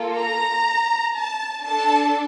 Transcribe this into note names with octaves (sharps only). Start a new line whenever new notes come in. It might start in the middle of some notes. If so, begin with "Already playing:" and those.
Already playing: A#3 F4 A4
A#5
A5
D4 A4 A5